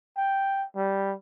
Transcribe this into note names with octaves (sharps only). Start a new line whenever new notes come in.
G5
G3